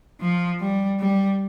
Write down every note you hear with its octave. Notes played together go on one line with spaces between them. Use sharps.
F3
G3
G3